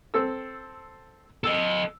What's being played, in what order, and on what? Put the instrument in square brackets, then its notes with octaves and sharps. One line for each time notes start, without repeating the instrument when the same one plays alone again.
[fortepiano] C4 A4 E6
[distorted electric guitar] A4 D#5 [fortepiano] E6